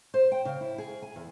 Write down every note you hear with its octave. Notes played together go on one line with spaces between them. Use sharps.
C5
G5
C#3
E4
G#4
G#5
E2